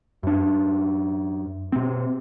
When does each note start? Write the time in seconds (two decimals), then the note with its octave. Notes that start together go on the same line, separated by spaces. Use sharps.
0.23 F#2 D4
1.72 B2 C4